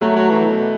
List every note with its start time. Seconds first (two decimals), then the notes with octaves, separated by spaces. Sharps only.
0.01 F#3 A3
0.16 F#3
0.30 E3
0.46 B2